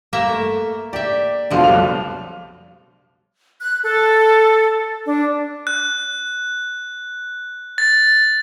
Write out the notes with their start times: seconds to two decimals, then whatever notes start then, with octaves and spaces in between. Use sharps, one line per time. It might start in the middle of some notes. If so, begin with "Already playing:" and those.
0.13 G2 A#3 E5 E7
0.28 A3
0.93 G4 D5 E5
1.51 F1 B2 D3 F3 F4
1.64 B1 G3 F7
3.61 F#6
3.84 A4
5.05 D4
5.67 F#6
7.78 A6